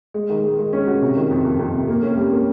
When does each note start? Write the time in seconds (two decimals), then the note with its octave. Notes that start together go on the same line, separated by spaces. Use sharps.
0.14 G#3
0.30 D#3
0.44 G#3
0.59 G#3
0.73 C#4
0.87 F#4
1.02 C3
1.16 D#3
1.31 F2
1.45 F2
1.59 F2
1.74 C3
1.88 A#3
2.03 C#4
2.17 G3
2.32 A#3